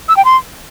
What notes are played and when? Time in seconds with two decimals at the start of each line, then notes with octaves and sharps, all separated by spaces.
0.09 E6
0.17 G5
0.25 C6